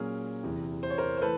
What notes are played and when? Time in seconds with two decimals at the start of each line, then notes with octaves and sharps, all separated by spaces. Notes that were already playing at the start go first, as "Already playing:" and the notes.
Already playing: A#2 F#3 A#3 C#4 G#4 A#4
0.43 E2 C3 E3
0.83 C5
0.90 C#5
0.98 A#4 C5
1.17 C5
1.21 E3 A3 A4 B4